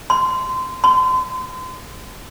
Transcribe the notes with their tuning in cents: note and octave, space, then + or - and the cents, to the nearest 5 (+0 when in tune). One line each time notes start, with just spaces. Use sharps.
C6 -20
C6 -35